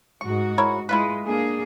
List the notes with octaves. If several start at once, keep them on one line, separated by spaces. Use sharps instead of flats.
G#2 F#4 C#6
E4 A#4 C#5
G#3 E4 F4 B4
A#3 D4 G#4